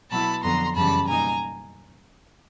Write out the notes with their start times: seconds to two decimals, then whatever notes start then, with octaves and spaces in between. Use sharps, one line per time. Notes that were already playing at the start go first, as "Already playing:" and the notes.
0.10 B2 F#3 B3 E4 A5 B5
0.43 F2 D3 F#3 B3 A#5 C6
0.75 F#2 C#3 E3 G3 A5 B5
1.08 B2 G3 A#3 D#4 G#5 A#5